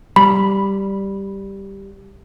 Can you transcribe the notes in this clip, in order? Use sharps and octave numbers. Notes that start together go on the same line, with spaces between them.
G3 B5